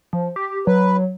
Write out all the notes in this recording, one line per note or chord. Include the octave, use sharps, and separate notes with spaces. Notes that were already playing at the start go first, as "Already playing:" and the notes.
F3
G4
F#3 B4